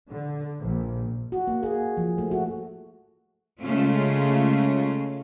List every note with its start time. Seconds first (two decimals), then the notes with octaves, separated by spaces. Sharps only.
0.11 D3
0.59 A#1
1.32 F#4
1.47 A#3
1.63 G#4
1.97 F3
2.18 A3
2.31 F#4
3.62 C#3 G#3 A3 C#4 F4